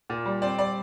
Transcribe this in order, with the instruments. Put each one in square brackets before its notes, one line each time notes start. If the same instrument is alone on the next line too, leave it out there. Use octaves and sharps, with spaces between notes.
[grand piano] A#2
G3
C4 D5
G3 D5